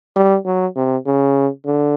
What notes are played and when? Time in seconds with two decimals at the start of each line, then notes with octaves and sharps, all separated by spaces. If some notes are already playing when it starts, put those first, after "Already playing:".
0.16 G3
0.46 F#3
0.76 C3
1.06 C#3
1.65 D3